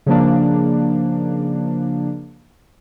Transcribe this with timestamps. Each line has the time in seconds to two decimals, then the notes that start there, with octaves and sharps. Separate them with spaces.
0.06 C#3 F3 A#3 D4